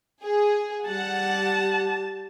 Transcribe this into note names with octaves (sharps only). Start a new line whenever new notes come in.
G#4
G3 F#5 A5